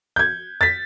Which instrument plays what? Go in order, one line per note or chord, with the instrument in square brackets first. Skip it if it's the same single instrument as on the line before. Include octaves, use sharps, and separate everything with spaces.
[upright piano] G6 G#6
A6 B6